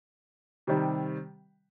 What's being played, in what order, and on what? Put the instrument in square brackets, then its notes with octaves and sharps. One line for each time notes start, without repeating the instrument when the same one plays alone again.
[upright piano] C3 D#3 G3